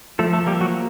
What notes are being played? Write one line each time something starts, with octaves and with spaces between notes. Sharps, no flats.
F3 A3 A4
A3 A4
G3 A#3 G4
F#3 F#4